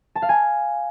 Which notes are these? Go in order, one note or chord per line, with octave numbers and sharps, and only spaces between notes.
A5
F5
G#5